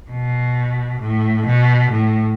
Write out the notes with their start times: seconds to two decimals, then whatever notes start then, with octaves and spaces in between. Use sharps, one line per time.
0.11 B2
1.01 A2
1.46 B2
1.91 A2